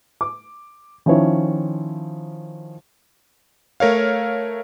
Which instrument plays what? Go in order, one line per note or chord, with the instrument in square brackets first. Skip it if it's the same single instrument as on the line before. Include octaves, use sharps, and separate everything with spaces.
[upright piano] D6
D#3 F3 C#4 E4 C#5
[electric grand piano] A3 A#4 C#5 F5